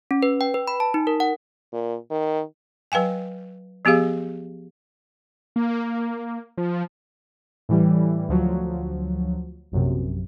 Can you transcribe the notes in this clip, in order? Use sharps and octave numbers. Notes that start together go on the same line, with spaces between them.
C#4
B4
G5
B4
B5
A5
D#4
A#4
F#5
A#2
D#3
F#3 B4 F5 G5 G#5
F3 B3 G4 G#4 F5
A#3
F3
A2 E3 G3
D2 F3 F#3
A#1 F#2 C3